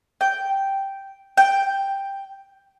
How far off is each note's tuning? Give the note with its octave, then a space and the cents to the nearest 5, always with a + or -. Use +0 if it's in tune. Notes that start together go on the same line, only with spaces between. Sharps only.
G5 -5
G5 +5